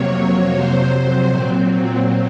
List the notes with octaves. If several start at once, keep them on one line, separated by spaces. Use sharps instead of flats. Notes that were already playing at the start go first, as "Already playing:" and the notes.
Already playing: F2 C3 F#3 A#3 C#5
F2 C3 F#3 C5
C5
A#2 F#3 C4